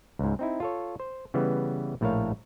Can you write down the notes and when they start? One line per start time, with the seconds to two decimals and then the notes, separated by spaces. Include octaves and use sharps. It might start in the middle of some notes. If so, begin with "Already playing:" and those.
0.19 C#2 G#2
0.39 C4 D#4 E4
0.60 F4 A4 C#5
1.00 C5
1.34 C#3 E3 G3 B3
2.01 A#1 A2 A3 A#4 C#5 F5